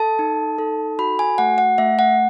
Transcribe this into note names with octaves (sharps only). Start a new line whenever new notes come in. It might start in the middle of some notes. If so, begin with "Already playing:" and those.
Already playing: A4 A5
D#4
A4
F#4 B5
G#5
A3 F#5
F#5
A3 E5
F#5